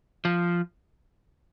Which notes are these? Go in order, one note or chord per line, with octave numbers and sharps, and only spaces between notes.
F3